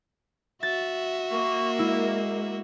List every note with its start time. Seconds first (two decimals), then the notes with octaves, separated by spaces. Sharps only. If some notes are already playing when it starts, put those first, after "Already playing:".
0.63 F#4 E5 A6
1.31 A#3 C#6
1.79 G#3 E4